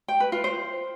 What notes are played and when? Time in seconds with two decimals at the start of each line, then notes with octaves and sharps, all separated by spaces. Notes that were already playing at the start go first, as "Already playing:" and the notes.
0.08 G5
0.20 B4
0.32 F4
0.44 C5